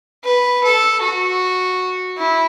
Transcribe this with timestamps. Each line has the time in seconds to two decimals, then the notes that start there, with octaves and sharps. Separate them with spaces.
0.24 B4
0.64 A4
1.02 F#4
2.18 E4